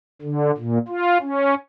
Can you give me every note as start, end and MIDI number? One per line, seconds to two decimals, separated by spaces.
0.22 0.51 50
0.57 0.78 46
0.88 1.18 65
1.21 1.55 61